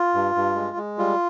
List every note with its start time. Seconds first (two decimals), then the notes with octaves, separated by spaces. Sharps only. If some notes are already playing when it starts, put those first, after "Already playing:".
Already playing: F4
0.14 G2
0.35 G2
0.55 G#3
0.77 G#3
0.98 G3 F4